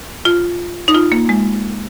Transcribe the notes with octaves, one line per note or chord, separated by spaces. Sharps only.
F4
D#4
F4
A#3
G#3